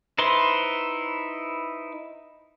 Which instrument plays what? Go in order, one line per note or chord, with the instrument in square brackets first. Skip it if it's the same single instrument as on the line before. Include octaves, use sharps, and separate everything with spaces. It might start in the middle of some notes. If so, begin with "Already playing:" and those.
[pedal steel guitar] D#4 E4 B4 C5 C6